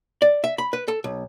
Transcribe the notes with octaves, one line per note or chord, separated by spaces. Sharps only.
D5
E5
B5
B4
A4
B1